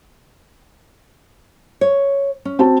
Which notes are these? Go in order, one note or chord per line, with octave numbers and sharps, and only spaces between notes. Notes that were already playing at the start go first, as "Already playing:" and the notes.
C#5
C#4
C4 F#4 A5